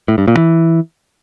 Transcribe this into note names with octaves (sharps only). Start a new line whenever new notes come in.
A2
G2
A#2
E3